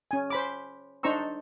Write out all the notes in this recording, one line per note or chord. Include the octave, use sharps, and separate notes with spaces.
C#4 G#5
C5 B5 D6
D4 D#4 C5 A#5 C#6 E6